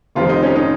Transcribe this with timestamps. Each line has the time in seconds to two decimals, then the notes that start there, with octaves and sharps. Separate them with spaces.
0.15 F1 F2 D#3 G3 C4 F4
0.29 D#4
0.43 C#4
0.56 D#4